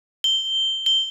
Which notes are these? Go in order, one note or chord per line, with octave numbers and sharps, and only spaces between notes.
G7
G7